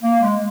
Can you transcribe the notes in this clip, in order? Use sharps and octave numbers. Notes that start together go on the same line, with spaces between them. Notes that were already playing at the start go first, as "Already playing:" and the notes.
A#3
G#3